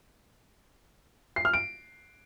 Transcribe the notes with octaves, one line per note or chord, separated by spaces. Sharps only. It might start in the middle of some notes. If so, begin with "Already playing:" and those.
C7
F6
D7